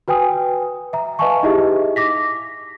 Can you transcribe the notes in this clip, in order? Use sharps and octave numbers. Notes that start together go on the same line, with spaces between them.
F#4 B4 G5 G#5 D#6
E5 A#5
B4 D#5 F5 G#5 A5 C#6
D#4 E4 G4 G#4 D#5 E5
D6 A#6 B6